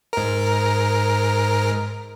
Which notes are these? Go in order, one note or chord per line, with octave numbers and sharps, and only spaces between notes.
G#2 A#4